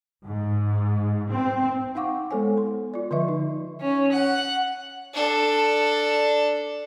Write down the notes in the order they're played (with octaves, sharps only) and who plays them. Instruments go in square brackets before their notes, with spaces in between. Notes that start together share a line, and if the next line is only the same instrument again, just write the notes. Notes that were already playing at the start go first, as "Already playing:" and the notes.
[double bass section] G#2
C4
[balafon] D#4 F5 F#5 C#6 D6
G#3 B3 A4 C5 C#5 G#5
C6
F4 D5
D3 F3 B4 D#5 E5 C#6
D#4
[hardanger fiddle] C#4
F#5
[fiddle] D4 A4